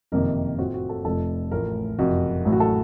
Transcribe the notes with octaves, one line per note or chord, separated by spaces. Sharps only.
F#1 F2 C3 D#3 A#3 A#4
A2 A3 C4 F4 F#4
F#4
A4
F1 F2 C3 F3 A4
A1 A2 F3 A3 A#4
F#1 F2 C3 F#4
A1 A2 F#3
F#4
A4